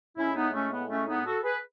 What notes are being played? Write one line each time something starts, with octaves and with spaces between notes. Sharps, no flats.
A2 G#3 C#4 E4
B3 D#4
A3 C#4
B3
A3 C#4
B3 D#4
F#4 A4
G#4 B4